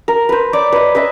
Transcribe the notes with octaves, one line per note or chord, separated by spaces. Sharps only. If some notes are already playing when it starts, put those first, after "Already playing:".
A#4
B4 C5
C#5 D5 D6
B4 D#5
B4 D#5 E5 G#5